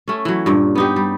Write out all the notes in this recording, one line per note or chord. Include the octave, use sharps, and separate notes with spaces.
A3 C#4
E3 F#3
G2 A#2
B3 D#4 G4
G3